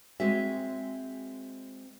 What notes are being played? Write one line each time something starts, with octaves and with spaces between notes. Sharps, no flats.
G#3 C4 F#4 G#4 E5